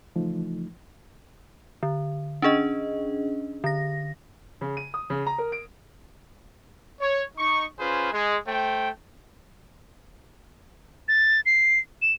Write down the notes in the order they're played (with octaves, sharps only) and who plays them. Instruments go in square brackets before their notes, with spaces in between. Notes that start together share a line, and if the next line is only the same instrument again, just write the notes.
[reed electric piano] C#3 E3 F3 A3 D#4
[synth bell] D3
C#4 D4 G#4 D#5
D3 A#6
[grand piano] C#3
D#7
D#6
C#3
A#5
A#4
D7
[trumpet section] C#5
D#4 C#6
C#4 F4 G#4 B4 C5
G#3
A3 C5 G5
[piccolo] A6
C7
E7